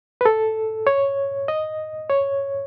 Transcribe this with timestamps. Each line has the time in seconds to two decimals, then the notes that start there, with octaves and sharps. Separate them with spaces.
0.21 B4
0.25 A4
0.87 C#5
1.48 D#5
2.10 C#5